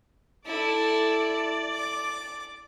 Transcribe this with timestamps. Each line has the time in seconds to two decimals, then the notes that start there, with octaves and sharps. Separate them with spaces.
0.46 E4 A4 D5
1.74 D6